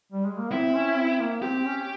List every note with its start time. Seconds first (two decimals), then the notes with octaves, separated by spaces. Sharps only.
0.12 G3
0.26 G#3
0.38 A#3
0.52 C4 E4
0.75 C#4
0.96 C4
1.20 A#3
1.42 C4 G4
1.65 C#4